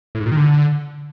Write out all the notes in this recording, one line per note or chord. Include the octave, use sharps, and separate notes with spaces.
A2
G#2
A#2
D#3
D3